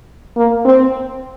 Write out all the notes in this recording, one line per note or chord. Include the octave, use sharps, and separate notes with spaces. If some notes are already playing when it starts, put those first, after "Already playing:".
A#3
C4